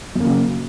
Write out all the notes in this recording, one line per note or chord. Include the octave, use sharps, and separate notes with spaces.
F#2 C#3 A#3